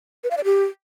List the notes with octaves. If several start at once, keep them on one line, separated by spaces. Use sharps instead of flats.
B4
F5
D5
G4